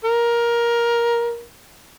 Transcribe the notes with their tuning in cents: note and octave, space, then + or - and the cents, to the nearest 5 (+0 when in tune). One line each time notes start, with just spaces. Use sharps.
A#4 +15